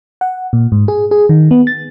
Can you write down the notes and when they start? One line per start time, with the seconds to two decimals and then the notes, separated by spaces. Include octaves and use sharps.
0.21 F#5
0.53 A#2
0.72 G#2
0.88 G#4
1.11 G#4
1.29 D#3
1.51 B3
1.67 A6